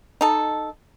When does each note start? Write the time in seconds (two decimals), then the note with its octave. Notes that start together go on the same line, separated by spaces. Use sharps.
0.21 D#4 A4